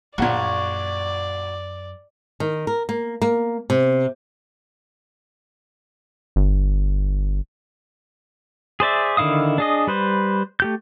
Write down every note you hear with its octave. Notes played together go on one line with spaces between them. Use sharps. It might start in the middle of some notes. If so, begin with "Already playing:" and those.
A#1 F#2 A#2 F#4 C#5 D5
D#3
A#4
A#3
A#3
C3
G1
G#4 C5 D5 E5
D3 D#3 E4 F5 D#6
D4 G#4 D#5
G3 B4 C5
A3 G4 G6